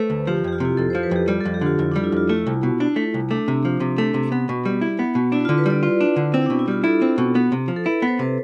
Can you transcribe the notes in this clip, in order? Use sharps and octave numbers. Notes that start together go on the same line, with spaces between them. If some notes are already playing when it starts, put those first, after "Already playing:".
Already playing: A3 A4 B4 C5
D2
F3 G4
F2 G4
F4
C3 E4
F2 A4
C5
F3
B4
F2 G4
G3 F4
A4
F2
G4
D3 F4
F2 E4
D4
G3
E4
F2 F4
A3 E4
C2
B2
D4
A3
C2
A3 D4
C3
F3
C3
A3
C3
B3
B2
G3
E4
B3
B2
D4 E4
F4
D3
B4
G3 D5
F4
D4
D3
C4 E4
D4
B2
E4
G3 F4
E4 A4
C4
B2
B3
C3
F3
A4
E4 B4
B3
C5
C3 B4